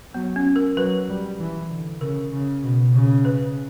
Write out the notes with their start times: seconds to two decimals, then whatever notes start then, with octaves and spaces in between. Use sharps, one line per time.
0.14 F#3 B3
0.36 C#4
0.56 A#4
0.77 F#3 B4
1.08 G3
1.39 E3
1.70 D3
2.01 C#3 A#4
2.32 C#3
2.63 B2
2.94 C#3
3.25 B4